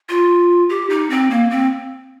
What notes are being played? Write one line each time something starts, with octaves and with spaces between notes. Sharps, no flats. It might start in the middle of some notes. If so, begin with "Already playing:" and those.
F4
G4
D#4
C4
A#3
C4